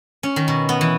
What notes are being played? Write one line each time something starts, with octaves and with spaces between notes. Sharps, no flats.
C#4
D#3
B2
B3
E3